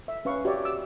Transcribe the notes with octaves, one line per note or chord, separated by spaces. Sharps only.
E5
C#4 B4 F5 C#6
F#4 G4 C#5 D5 E5
D6 E6